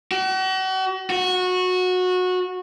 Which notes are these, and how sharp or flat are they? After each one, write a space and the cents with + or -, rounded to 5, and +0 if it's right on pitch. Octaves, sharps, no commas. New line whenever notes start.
F#4 +40
F#4 -20